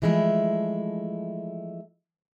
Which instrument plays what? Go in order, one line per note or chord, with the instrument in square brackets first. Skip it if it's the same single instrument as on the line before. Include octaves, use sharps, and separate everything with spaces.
[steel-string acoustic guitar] E3 F3 G#3 A3 E4